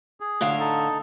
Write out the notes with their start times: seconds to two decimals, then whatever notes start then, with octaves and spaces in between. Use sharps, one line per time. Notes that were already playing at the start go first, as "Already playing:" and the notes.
0.20 G#4
0.41 A2 D3 F5
0.60 D#4 A4